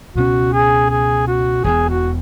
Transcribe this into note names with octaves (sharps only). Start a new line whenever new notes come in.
C#2 B2 G#3 C#4 F#4
G#4
G#4
F#4
E1 E2 B2 G#4
F#4